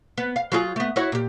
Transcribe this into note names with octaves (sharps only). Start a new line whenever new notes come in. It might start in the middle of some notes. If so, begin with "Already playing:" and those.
B3
F5
F#3 F4 G#4
A3 B3
E4 F#4 C#5
A#2 G4